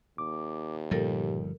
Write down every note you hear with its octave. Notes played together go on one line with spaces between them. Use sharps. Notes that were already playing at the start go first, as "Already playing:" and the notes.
D#2 D6
G1 A#2 F3 G3 G4 A4 A#4